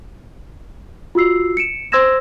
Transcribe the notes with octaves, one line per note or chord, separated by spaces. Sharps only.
F4 F#4 E6 C7
C#7 D7 E7
C5 C6 E6 G#6 A#6 E7